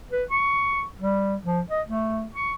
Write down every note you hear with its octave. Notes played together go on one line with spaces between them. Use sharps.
B4
C#6
G3
F3
D#5
A3
C#6